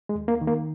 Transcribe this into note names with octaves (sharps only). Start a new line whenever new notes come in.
G#3
D#2
A#3
D#3
A#3